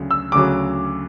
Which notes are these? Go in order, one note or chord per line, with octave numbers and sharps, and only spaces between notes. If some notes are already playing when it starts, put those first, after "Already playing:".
Already playing: D2 C#3 F#3
E6
D2 C#3 F#3 D6